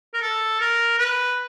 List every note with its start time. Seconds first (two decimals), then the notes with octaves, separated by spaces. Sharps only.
0.14 A#4
0.22 A4
0.61 A#4
0.99 B4